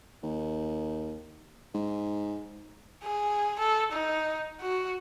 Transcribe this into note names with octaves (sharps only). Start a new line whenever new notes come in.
D#2
G#2
G#4
A4
D#4
F#4